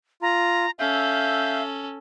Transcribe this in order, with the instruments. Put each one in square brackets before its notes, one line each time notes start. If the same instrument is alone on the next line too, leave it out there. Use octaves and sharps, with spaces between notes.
[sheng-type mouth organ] F4 [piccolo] A#5
[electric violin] C#4 A4 [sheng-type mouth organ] E5 F5 [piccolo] G6